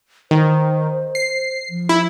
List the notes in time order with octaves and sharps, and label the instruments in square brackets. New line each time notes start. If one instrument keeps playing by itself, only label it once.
[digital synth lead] D#3 [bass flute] C5
[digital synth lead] C7
[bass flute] F3
[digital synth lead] E4